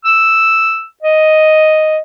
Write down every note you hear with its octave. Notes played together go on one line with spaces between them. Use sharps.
E6
D#5